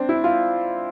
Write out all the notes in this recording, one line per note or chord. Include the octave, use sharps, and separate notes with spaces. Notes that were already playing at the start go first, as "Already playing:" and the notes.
Already playing: C4 D4
E4
F4